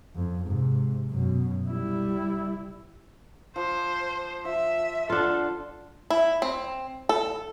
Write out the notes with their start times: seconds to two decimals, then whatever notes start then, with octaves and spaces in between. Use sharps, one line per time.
0.16 F2
0.45 G#2 C3
1.09 F#2 B2
1.70 G3 E4
3.56 F3 C5
4.45 F3 E5
5.10 D3 D4 F4 A4 C6
6.10 E4
6.42 C4
7.09 A4